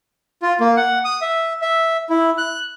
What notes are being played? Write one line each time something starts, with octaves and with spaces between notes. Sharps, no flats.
F4
A#3
F#5
D#6
E5
E5
E4
F#6